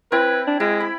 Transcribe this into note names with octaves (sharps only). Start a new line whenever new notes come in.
C4 E4 B4
D4
G#3 E4
B5